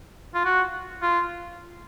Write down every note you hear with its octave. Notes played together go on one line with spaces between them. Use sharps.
F4
F#4
F4